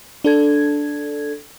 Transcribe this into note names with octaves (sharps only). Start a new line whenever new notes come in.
D4 A4 G#6